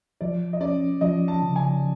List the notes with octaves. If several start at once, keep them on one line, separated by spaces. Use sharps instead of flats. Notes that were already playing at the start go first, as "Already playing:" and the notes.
F3 D5
D#5
C#4 D5
F3 D#5
A5
C#3
G#5